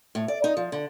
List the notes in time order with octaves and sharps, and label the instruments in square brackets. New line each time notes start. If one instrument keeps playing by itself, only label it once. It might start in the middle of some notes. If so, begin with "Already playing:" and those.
[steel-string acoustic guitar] A2
D5
D#4
F3
D3